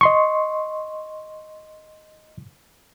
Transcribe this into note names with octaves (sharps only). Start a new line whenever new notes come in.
D#5 C6 C#6